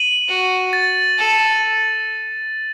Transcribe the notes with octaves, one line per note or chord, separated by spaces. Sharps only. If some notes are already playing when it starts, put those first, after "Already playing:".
Already playing: D#7 F#7
F#4
A6
A4